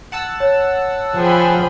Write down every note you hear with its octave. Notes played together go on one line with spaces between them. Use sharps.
F#5 A5 E6
C#5
F3 G#4 G5 B5